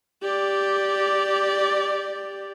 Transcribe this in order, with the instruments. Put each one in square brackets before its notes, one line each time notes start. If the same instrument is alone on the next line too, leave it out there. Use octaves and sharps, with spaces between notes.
[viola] G4 D5